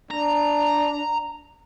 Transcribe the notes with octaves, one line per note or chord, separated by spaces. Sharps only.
D4 A#5